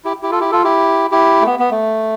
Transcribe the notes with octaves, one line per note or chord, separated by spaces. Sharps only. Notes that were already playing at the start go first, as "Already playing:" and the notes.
E4 G4
E4 G4
F4 A4
E4 G4
F4 A4
E4 G4
E4 G4
A3
B3
B3
A3